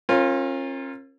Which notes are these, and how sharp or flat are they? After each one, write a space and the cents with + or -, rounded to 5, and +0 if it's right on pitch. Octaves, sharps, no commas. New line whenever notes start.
C#4 -40 F4 +0 A#4 +0